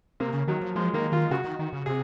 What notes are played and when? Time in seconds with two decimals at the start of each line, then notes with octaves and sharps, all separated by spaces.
0.20 C3 A#3
0.33 C#3
0.48 D#3 F#3
0.61 F3
0.76 F3 G#3
0.94 D#3 A#3
1.12 D#3 F4
1.31 C#3 F#4
1.45 D#3
1.59 D#3
1.73 C#3
1.86 C3 G#4